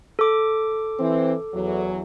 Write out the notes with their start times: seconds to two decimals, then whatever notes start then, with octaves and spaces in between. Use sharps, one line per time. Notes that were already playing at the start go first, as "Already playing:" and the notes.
0.19 A4 D6
0.99 E3 C4
1.54 E2 F#3